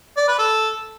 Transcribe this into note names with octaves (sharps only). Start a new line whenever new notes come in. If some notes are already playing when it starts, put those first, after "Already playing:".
D5
B4
A4